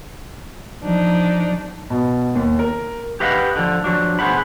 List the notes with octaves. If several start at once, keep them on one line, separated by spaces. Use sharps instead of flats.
F3 D4 D#4
B2
D#2
A#4
G4 B4 D#5 F5 F#5
D3 F3
F3 F#3 D4
B2 G#4 C5 F#5 B5